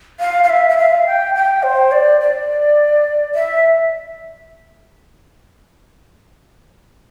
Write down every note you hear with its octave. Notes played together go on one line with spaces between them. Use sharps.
F5
F5
E5
E5
F5
G5
G5
C5
D5
D5
E5